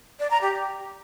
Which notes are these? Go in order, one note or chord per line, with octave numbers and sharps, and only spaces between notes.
D5
A#5
G4